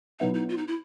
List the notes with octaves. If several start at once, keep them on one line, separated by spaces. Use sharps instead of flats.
B2 F#3 B3 D#4 E4
D#4
F4
D#4
E4